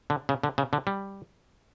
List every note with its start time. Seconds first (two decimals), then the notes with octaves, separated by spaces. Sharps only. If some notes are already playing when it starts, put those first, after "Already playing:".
0.10 D3
0.29 C#3
0.43 D3
0.58 C#3
0.73 D3
0.87 G3